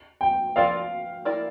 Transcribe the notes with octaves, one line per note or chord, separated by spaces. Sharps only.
G5
F3 C4 F4 A#4 D5 F5
A#3 E4 A#4 D5